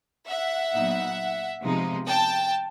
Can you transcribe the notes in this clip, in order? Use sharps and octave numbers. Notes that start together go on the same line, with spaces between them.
E5 F#5
A#2 F#3 B3 D#4
C3 F3 G#3 B3 D#4
G5 A5